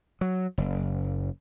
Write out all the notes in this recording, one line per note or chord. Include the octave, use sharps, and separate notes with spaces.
F#3
F#1